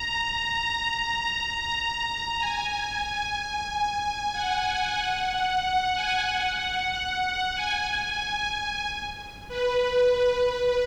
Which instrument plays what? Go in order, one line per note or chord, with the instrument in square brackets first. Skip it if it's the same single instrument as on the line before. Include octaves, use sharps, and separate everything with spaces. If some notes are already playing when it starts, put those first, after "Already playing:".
Already playing: [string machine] A#5
G#5
G#5
G#5
F#5
F#5
G#5
F#5
G#5
G#5
B4